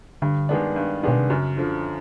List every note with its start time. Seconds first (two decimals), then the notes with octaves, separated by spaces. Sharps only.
0.22 G2 D3
0.49 D#3 G#3 B3 D4
0.76 G2
1.03 B2 D#3 G#3 B3 D4
1.19 C3
1.30 F#2 C#3
1.57 D3 F3